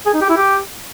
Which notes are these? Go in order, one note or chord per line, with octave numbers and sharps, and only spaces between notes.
G#4
D#4
G4
E4
G4